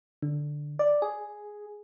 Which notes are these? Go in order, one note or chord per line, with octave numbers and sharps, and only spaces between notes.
D3
D5
G#4